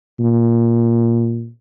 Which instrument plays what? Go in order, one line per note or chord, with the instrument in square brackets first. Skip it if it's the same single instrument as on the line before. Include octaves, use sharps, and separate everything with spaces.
[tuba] A#2